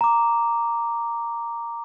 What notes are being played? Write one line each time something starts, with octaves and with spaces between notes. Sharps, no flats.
A#5 D6